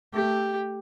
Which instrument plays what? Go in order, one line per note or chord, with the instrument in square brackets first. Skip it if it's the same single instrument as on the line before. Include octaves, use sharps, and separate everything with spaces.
[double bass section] A3 [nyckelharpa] G4